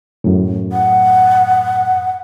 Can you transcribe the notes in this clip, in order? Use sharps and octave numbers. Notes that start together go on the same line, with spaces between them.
F#2 A2
F#5